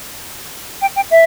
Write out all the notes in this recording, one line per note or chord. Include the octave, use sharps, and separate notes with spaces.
G5
G5
E5